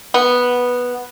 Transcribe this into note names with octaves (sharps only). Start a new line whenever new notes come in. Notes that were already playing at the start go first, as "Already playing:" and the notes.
B3